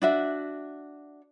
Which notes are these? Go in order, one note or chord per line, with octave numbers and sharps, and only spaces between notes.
D4 F#4 E5